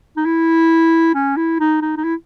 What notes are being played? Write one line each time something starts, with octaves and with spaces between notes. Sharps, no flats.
D#4
E4
C#4
E4
D#4
D#4
D#4
E4